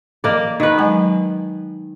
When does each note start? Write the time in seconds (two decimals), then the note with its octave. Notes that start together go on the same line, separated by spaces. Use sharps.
0.24 E3 A#3 D5
0.60 D#3 B4
0.78 F#3 G#3 G#5